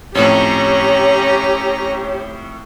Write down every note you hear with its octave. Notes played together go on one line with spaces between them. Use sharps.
F2 A2 C#4 G4 C#5 A#5